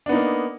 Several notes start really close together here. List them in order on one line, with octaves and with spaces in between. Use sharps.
D4 B3 D#4 A#3